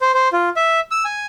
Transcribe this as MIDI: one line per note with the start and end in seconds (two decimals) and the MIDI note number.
0.01 0.12 72
0.14 0.28 72
0.33 0.49 65
0.56 0.80 76
0.91 1.04 88
1.05 1.26 80